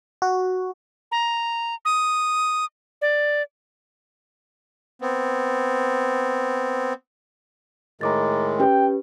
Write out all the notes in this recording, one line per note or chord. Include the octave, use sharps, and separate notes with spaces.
F#4
A#5
D#6
D5
B3 C4
A2 D#3 G#3 A#5 D6 A6
C#4 G4 B4 G5